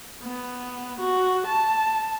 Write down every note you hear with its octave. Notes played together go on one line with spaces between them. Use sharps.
B3
F#4
A5